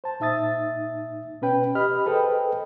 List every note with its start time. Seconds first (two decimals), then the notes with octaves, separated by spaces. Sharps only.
0.04 C5 A5
0.20 A#2 D#4 E5 D#6 A6
1.42 B2 C#4 B4 G5
1.75 G4 D#5 B5 F6
2.06 G#4 A4 B4 C5 D#5 G5